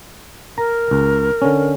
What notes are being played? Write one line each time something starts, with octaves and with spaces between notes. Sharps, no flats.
A#4 A#5
C#2
D3 C#4